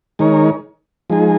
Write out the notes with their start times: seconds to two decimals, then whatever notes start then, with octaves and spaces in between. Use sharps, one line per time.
0.19 D#3 G#3 D#4 A#4 C#5
1.10 F3 G#3 D#4 G#4